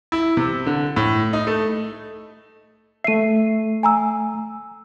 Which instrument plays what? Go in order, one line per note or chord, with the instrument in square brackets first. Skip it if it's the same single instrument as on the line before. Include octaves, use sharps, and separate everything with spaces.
[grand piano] E4
C3
D3
A2
D#4
A3
[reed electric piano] A3 E5 [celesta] C7 D#7
[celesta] G#5 A#5 E6